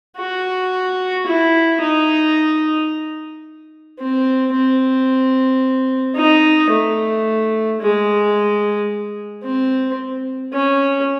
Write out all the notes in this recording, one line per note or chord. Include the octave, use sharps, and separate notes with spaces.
F#4
E4
D#4
C4
C4
D#4
A3
G#3
C4
C#4